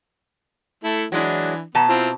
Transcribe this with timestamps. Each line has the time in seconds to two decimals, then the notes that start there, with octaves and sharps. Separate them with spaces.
0.84 A3 E4 A4
1.12 E3 F#3 G#3 D4 E4
1.75 B2 B3 A5 A#5
1.89 C4 E4 F4